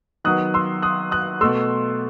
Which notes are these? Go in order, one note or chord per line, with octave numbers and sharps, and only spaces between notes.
D#3 F#3 B3 D#6 F#6
C6 E6
D#6 F#6
D#6 F#6
B2 A3 C6 E6